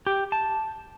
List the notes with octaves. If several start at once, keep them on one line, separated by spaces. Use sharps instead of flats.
G4
A5